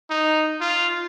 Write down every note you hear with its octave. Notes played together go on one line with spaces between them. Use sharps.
D#4
F4